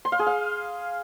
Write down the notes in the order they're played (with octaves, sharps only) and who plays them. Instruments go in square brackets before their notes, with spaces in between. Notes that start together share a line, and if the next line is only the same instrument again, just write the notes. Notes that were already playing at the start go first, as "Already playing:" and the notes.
[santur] C6
F5
G#4
F5